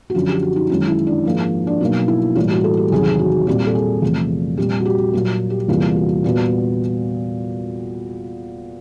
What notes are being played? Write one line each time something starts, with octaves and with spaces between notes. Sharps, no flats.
F#4
F#2 D3 F3 F4
G4
F#4
D#4
F#2 D#3 G#3 E4
E4
D4
G#2 F3 A#3
D4
B2 F#3 A#3 D#4
E4
A2 E3 G3 A#3 F4
F#4
A4
G4
E2 C3 D#3 F#3 G#4
F#4
A#2 G3 C4 G4
A4
G#4
E2 C3 F3 A3
A#2 G3 C4 G4
F#4
G4
A#2 F#3 A#3 F#4
G4
E2 C3 E3 G3 A#3 F4
F#4
A#2 G3 B3 F#4